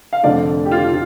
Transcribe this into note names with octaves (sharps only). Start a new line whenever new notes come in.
F5
F1 F2 D3 F3 A3 D5
G4
F4
F4